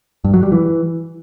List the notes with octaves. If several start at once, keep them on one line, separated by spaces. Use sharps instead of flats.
G2
F#3
G3
E3